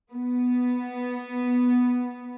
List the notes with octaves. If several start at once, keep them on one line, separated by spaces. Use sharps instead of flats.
B3